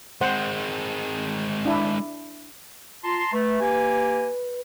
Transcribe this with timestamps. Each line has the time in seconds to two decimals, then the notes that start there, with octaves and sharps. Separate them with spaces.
0.21 G#3 C4 C5 F#5
1.65 D4 E4
3.04 F4 A5 A#5 C6
3.33 A3 B4
3.60 A#3 G4 G#5